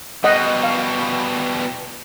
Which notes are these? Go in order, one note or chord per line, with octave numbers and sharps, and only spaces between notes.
B2 G3 D#5 F#5
F5